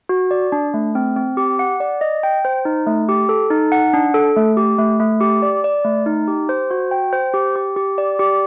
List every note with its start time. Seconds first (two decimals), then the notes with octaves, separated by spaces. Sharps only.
0.09 F#4
0.31 D5
0.52 D4
0.74 A3
0.95 C4
1.17 C4
1.37 G4
1.59 F#5
1.80 D5
2.01 D#5
2.23 G5
2.45 C5
2.65 D#4
2.87 A3
3.09 G4
3.29 A4
3.50 D#4
3.72 F#5
3.93 D4
4.14 A4
4.36 A3
4.57 G4
4.78 A3
5.00 A3
5.21 G4
5.42 D5
5.64 D5
5.84 A3
6.06 D#4
6.28 G4
6.49 C5
6.71 F#4
6.91 G5
7.13 C5
7.34 G4
7.56 G4
7.76 G4
7.98 D5
8.19 G4